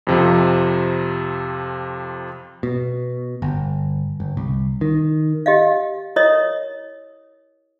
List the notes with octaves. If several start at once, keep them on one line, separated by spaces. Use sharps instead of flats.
F2 C3 F3
B2
G1
G1
C2
D#3
G4 D#5 F5
E4 A#4 C#5 D#5 D#6